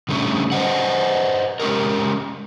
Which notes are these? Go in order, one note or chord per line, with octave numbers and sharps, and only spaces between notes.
D3 G3 A3 C4 C#4
B4 C5 D#5 F#5
G#3 C#4 G4 A#4